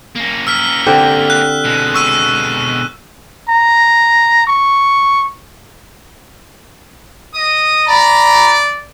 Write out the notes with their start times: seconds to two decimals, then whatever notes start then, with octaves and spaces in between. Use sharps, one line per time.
0.15 A#3 C#4
0.47 E6 F6 B6
0.86 D3 C4 G4
1.30 F#6
1.64 B2 G#3
1.94 C#6 E6 D#7
3.49 A#5
4.47 C#6
7.35 D#5 D#6
7.88 D5 A#5 B5